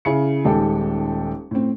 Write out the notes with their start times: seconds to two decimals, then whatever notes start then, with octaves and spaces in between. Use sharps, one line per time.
0.05 C#3 E4 E5 C#7
0.45 D#1 G#3 G4 A4 G5
1.51 A2 C4